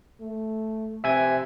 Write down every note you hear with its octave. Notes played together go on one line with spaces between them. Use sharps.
A3
C3 E5 G#5 G#6